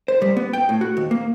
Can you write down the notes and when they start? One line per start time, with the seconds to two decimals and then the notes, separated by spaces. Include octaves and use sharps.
0.08 C5
0.22 G3
0.37 B3
0.53 G5
0.69 A2
0.81 F#4
0.97 D#2
1.11 A#3